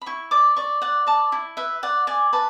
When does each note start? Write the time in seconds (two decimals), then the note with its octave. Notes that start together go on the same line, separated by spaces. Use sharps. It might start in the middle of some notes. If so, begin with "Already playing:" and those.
0.02 B5
0.06 E4 C#6
0.31 D5 D6
0.56 D5 C#6
0.82 D5 F#5
1.07 D5 A5
1.32 E4
1.57 B4 E5
1.83 D5 F#5
2.07 D5 G#5
2.33 B4 A5